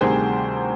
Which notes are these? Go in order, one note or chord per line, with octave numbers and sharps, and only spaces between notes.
D2 C3 D#3 G3 G#4 C5